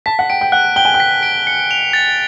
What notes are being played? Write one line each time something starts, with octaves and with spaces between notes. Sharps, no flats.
A5 B6
F#5
G5 D7
G5
F#5 F#6
G5 G7
G#5
G5
B6
D7
C#7
F7
A6